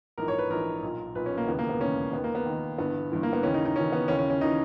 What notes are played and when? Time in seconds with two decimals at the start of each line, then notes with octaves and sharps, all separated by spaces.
0.18 A#1 G#2 E3 A#4
0.28 C#5
0.39 B4
0.50 A#1 G#2 E3 A#4
0.83 B1 A#2
1.15 B1 A#2 B4
1.26 C#4
1.38 A#3
1.48 E1 D#2 C#3 E3 B3
1.59 A#3
1.69 B3
1.80 E1 D#2 C#3 E3 C#4
2.13 D#2 B3
2.17 D#3
2.24 A#3
2.35 B3
2.46 D#2 D#3
2.78 G1 G2 E3 B3
3.11 G1 G2 E3
3.23 A#3
3.33 B3
3.43 D#2 C#3 E3 C#4
3.54 D#4
3.65 D#4
3.76 D#2 C#3 E3 C#4
3.92 B3
4.08 D#2 C#3 E3 C#4
4.19 C#4
4.30 C#4
4.41 C#3 E3 D#4